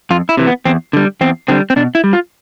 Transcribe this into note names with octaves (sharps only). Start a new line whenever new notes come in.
F2 F4
E4
C3 E3
B3
E2 C4
D3 G3
E2 C4
D3 G3 C4
C4
B2 D4
E4
G3
F4